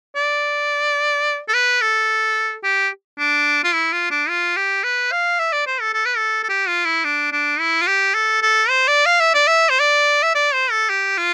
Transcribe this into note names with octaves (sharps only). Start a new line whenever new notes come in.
D5
A4
B4
A4
G4
D4
F4
E4
F4
D4
F4
G4
B4
F5
E5
D5
C5
A4
A4
B4
A4
A4
G4
F4
E4
D4
D4
E4
F4
G4
A4
A4
C5
D5
F5
E5
D5
E5
C5
D5
E5
D5
C5
A4
G4
F4